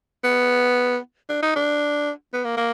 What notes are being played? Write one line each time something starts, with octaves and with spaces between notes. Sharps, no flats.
B3
D4
D#4
D4
B3
A#3
A#3